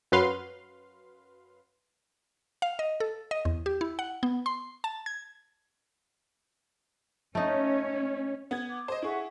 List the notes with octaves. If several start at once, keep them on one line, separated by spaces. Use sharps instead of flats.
F#2 F#3 B4 F5 C6
F5
D#5
A4
D#5
E2
G4
E4
F#5
B3
C6
A5
G#6
A3 C#4 D#4
B3 G#6
D6
C5 D#5
E4 G#4 E5 F#5 C#6